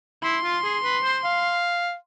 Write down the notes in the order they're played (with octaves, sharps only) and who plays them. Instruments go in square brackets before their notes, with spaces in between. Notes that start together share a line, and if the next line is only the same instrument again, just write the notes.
[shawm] E4 [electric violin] C6
[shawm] F4
G#4
B4
C5
F5